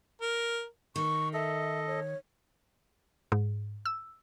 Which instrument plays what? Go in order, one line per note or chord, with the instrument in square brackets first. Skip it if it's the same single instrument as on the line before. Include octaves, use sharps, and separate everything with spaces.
[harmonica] A#4
[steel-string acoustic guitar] D#3 [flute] C#6
[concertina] A4 D#5 [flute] E5
[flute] C#5
[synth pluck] G#2
E6